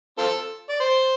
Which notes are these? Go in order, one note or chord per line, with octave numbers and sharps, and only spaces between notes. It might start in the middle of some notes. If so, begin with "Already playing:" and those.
C4 F4 A4
D5
C5